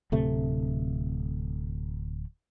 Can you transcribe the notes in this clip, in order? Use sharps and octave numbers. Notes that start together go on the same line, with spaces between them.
D1 C3 A3